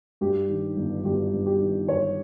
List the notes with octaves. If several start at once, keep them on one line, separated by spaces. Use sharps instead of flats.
G2 G4
D#3
G1
G1 G4
G2
G4
D#3
G1 C#5